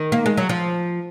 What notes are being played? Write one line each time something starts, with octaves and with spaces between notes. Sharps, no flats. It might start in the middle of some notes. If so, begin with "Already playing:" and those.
Already playing: D#3
A#3
G#3
F#3
F3